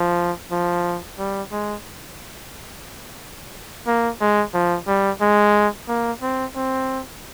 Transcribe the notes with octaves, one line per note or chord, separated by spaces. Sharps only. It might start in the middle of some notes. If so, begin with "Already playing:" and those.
Already playing: F3
F3
G3
G#3
A#3
G#3
F3
G3
G#3
A#3
C4
C4